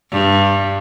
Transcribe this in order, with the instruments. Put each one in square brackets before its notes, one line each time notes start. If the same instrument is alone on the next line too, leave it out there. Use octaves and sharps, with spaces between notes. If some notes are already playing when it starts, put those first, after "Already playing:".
[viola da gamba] G2